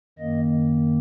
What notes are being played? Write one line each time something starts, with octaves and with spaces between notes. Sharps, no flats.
F#2 D#3 A#3 D#5